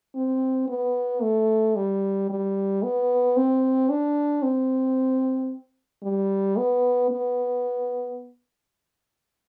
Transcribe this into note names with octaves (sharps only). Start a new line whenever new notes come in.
C4
B3
A3
G3
G3
B3
C4
D4
C4
G3
B3
B3